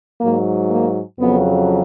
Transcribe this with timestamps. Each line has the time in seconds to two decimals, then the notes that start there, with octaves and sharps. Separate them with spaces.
0.20 G#2 F#3 A#3
0.70 A#3
1.19 F2 C#3 F#3 B3